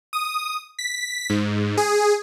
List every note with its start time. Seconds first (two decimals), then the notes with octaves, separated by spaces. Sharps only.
0.13 D#6
0.79 B6
1.30 G#2
1.77 G#4